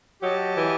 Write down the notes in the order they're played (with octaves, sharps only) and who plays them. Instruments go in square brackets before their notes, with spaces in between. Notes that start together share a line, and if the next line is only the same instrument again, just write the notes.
[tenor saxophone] F#3 [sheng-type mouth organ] G4 D#5 A5
[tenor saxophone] E3